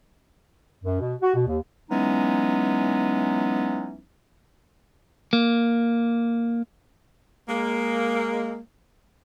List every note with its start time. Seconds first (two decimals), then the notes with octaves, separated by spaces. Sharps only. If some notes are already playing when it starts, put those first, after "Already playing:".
0.83 F#2
0.99 B2
1.21 F#4
1.35 B2
1.47 D#2
1.91 E3 F#3 G#3 B3 C#4 D#4
5.33 A#3
7.48 G#3 A#3